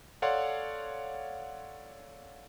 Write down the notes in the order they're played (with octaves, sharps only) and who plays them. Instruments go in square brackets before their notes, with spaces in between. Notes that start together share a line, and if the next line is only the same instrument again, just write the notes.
[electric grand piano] A4 C#5 D5 F5 F#5 C6